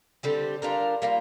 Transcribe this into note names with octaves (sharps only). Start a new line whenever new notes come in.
D3 G3 C4 G4
G3 D4 F4 A#4
G3 A#3 F4